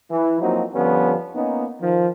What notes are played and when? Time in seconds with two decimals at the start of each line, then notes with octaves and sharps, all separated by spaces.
0.10 E3
0.41 F3 F#3 A#3 C4 D#4 F#4
0.74 F2 D3 F3 G3 B3 C#4
1.35 A#3 B3 C#4 D#4
1.81 D#3 F3